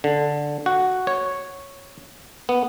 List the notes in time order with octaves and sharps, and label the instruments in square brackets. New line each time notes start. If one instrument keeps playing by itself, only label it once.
[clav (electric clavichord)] D3
F#4
C#5
B3